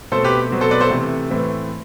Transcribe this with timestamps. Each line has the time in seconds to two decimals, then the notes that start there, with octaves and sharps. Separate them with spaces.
0.12 B2 A3 C4 A4 C5
0.24 G4 B4
0.51 B2 F#3 C4
0.61 A4 C5
0.71 B4 D5
0.81 A4 C5
0.90 C3 E3 A3
1.30 A2 E3 A3 C4